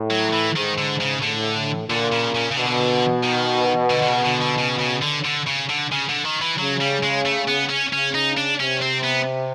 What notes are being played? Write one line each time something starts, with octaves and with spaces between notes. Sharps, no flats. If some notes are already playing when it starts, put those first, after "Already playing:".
Already playing: A2
F#3
E3
G#2 D#3
D3
C#3
A2 D3
A#2 D3
C#3
C#3
C#3
B2 D3
D#3
D3
D3
C#3
D3
D3
C#3
C#3
D3
D3
C#3
D3
C#3
D3
D#3
E3
C#3 F#3
G3
G#3
A3
B3
C#4
C#3 C#4
D#4
D4
C3 C#4
C4
B3